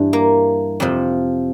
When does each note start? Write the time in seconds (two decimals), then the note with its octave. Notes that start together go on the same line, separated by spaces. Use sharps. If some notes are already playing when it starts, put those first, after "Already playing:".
Already playing: G2 E3 D4
0.13 A#3
0.80 F2 C3 F3